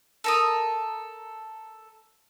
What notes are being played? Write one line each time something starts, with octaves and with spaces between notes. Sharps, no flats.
A4 A#4 D#6